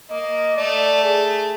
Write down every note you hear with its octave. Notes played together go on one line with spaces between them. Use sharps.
A#3 D#5
A3 D5
G#4